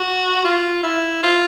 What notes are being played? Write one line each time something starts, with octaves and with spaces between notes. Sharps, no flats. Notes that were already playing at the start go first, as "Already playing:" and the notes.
Already playing: F#4
F4
E4
F4